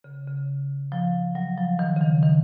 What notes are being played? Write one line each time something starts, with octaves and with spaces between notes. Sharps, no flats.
C#3
C#3
F3
F#3
F3
D#3
C#3
D#3
D#3